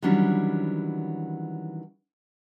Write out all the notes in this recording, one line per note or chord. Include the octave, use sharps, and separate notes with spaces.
D#3 E3 F#3 G3 C#4 D4